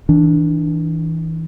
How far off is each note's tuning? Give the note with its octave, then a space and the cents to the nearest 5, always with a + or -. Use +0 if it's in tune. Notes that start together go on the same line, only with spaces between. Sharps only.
E3 -30 D4 +0